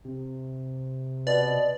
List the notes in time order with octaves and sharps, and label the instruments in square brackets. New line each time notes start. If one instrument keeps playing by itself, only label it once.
[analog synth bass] C3
[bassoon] B2 [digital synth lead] D5